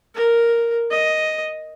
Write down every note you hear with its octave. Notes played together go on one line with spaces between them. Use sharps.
A#4
D#5